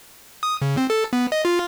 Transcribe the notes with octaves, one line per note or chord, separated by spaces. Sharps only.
D#6
C#3
C4
A4
B3
D#5
F4